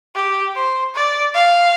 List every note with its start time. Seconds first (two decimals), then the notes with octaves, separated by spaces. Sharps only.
0.15 G4
0.55 C5
0.94 D5
1.34 F5